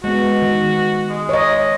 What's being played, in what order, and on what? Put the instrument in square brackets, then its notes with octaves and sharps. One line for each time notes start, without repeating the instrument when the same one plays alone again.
[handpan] G#3 B3 [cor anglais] F#4
[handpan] D#3
[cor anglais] G#3
[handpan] C#5 D#5